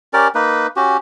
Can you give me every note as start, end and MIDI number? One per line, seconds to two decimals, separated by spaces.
0.13 0.28 61
0.13 0.28 67
0.13 0.28 70
0.13 0.28 74
0.35 0.67 58
0.35 0.67 63
0.35 0.67 71
0.76 0.97 61
0.76 0.97 66
0.76 0.97 67